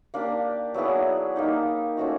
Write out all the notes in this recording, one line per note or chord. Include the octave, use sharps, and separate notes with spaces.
A#3 D4 G4
F#3 B3 E4 G#4
A#3 D#4 G4
F3 A3 C#4 F#4